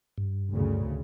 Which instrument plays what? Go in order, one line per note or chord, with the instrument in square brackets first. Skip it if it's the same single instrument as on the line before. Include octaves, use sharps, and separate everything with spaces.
[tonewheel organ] G2
[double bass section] D2 C#3